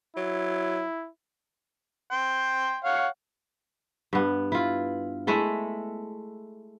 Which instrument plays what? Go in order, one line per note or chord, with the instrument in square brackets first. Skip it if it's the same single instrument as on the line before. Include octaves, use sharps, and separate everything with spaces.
[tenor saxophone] F#3 [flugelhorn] E4
[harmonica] G5 C6
C#5 F5 F#5
[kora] G2 B3
E4 F4
G#3 A3 E4 A4